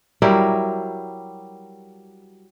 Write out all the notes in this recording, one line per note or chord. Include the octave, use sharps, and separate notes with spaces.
F#3 G3 E4 A#4